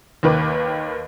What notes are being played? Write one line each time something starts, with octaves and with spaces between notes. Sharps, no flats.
D#2 D#3 B4 D6